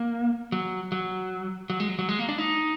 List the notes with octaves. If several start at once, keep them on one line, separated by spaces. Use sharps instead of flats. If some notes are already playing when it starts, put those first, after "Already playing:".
Already playing: A#3
F#3
F#3
F#3
G#3
F#3
F#3
G#3
A#3
D4
D#4